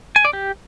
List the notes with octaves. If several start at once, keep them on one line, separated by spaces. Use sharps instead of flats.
G#5
D5
G4